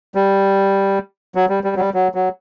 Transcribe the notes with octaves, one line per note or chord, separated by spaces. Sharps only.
G3
F#3
G3
G3
F#3
G3
F#3
F#3